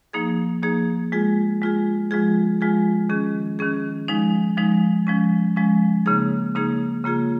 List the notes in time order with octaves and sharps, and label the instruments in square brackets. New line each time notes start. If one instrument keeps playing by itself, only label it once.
[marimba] F3 A#3 D#4 G#4
F3 A#3 D#4 G#4
G#3 F4 G#4
G#3 F4 G#4
F3 G#3 F4 G#4
F3 G#3 F4 G#4
D#3 C#4 G#4
D#3 C#4 G#4
F3 G#3 D#4
F3 G#3 D#4
F3 G#3 C#4
F3 G#3 C#4
C#3 A#3 D#4 G#4
C#3 A#3 D#4 G#4
C#3 A#3 F4 G#4